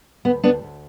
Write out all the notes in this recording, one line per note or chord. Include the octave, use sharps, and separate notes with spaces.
D2 B3
D2 B3 D4
D2